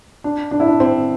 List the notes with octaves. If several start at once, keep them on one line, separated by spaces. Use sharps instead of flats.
D4
D4
E4
D4
C4